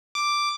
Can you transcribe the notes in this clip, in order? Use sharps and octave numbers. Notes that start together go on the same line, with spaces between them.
D6